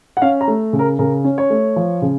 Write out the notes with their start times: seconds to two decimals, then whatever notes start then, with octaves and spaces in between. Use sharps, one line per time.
0.17 F#5
0.22 C#4 F5
0.41 A#5
0.48 A3
0.73 C#3
0.79 A#4
0.99 C#3 A#4
1.24 C#4
1.38 C#5
1.50 A3
1.76 F3
2.02 C#3